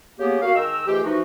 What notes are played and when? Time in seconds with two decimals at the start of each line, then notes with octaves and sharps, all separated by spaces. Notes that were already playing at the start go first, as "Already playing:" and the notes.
0.20 C#3 A#3 B3 G4
0.42 A#3 F#4 F5
0.55 D#3 G#3 A#4 G5 A#5 E6
0.87 G#2 D#3 E3 A3 F4 G4
1.03 E3 F3 D#4 F#4